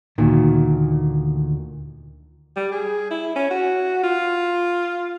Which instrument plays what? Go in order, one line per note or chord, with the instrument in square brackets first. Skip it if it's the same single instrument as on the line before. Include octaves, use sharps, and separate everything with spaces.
[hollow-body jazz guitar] D2 A#2 D#3
[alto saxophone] G3
G#4
E4
C#4
F#4
F4